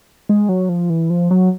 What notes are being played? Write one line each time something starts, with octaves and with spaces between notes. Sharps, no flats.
G#3
F#3
F3
E3
F3
F#3